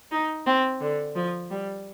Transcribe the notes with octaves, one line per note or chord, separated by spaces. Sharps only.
D#4
C4
D3
F3
G3